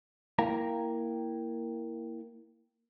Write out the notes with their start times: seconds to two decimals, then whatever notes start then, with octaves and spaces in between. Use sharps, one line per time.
0.39 A#3 E4 A#4 F5 G5 A#5